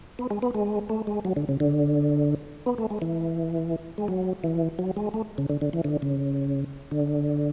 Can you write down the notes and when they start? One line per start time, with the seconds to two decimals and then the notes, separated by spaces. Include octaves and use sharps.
0.19 B3
0.31 G#3
0.42 B3
0.54 G#3
0.89 A3
1.07 G#3
1.25 F#3
1.36 D3
1.49 C#3
1.60 D3
2.66 B3
2.78 A3
2.90 G#3
3.02 E3
3.98 G#3
4.08 F#3
4.44 E3
4.79 F#3
4.97 G#3
5.14 A3
5.38 C#3
5.49 D3
5.61 D3
5.73 E3
5.84 D3
6.02 C#3
6.91 D3